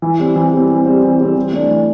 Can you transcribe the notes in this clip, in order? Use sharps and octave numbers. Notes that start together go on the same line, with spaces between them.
E3
G3 C4
E3
G3 C4
E3
G3 C4
E3
G3 C4
E3
A3 D4
E3